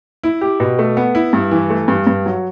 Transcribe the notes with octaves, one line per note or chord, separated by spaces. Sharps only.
E4
G4
B2
A3
B3
E4
G2
E3
A3
G2
G2
F#3